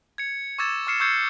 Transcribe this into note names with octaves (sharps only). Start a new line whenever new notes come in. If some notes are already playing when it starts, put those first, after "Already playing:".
G#6 C#7
C#6 D6 E6 G#6 A6 E7
C#6 D6 F6 C7 C#7 E7
C#6 E6 G6 G#6 C7 C#7